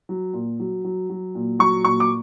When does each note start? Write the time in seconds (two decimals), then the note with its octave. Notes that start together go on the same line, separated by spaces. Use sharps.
0.09 F#3
0.33 A#2
0.60 F#3
0.85 F#3
1.10 F#3
1.35 A#2
1.59 F#3 C#6
1.85 A#2 C#6
2.00 D6